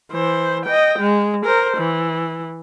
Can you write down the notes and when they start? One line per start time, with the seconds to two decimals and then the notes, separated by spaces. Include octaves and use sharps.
0.12 E3 C5
0.66 D#5 G5
0.99 G#3
1.46 A#4 C5
1.78 E3